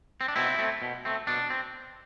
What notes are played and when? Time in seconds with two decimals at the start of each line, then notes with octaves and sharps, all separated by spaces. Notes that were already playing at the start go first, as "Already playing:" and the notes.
0.21 C4
0.28 D4
0.36 B2 C4 E4
0.58 A3 C4
0.82 B2
1.05 A3 C4
1.27 B2 D4
1.50 C4